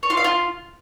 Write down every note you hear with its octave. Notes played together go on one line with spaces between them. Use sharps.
C#5
F4
F5
F4